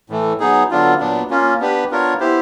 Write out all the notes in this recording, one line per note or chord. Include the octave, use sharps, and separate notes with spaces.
A2 E3 A3
F#3 B3 D#4 G#4
D3 F#3 B3 D4 F4
A#2 F#3 B3 D4
A#3 C#4 F4
B3 D4 G4 B4
B3 D4 F4 A#4 C#5
B3 E4 G4 C5